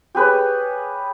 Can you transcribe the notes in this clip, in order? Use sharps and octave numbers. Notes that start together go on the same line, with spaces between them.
G4 G#4 B4 C#5